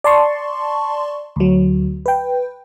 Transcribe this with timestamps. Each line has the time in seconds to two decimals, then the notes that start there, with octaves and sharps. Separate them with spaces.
0.04 D5 A5 C6 C#6
1.36 D2 F#3
2.06 B4 G5